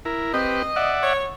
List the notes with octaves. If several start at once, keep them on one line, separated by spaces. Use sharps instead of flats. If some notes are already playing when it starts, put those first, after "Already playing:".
E4 A#4
C4 G4 B4 D#5
D5 E5 F#5
C#5